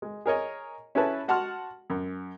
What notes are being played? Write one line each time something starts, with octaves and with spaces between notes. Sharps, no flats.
G#3
G#4 A#4 C#5 D#5
C#4 E4 G#4 A4 B4 A5
F#4 F#5 A5 C6 F6
F#2